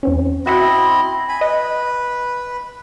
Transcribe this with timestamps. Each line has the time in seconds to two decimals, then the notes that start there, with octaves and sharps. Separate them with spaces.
0.03 E2 C4 C#4
0.46 C4 E4 F#4 D#5 E5 F#5
1.29 G#5 B5
1.41 B4 D#5